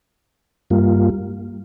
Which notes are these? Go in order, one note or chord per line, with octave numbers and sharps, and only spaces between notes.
G2 G3 A#3 F4